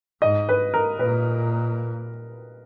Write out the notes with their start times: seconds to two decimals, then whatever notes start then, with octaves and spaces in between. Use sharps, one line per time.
0.22 G#2 D#5
0.49 B4
0.74 A#4
0.99 A#2 B4